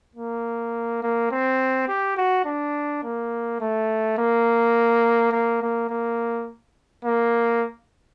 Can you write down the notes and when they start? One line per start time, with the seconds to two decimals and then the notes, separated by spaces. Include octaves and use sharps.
0.15 A#3
1.03 A#3
1.31 C4
1.89 G4
2.17 F#4
2.45 D4
3.04 A#3
3.61 A3
4.18 A#3
5.32 A#3
5.62 A#3
5.90 A#3
7.05 A#3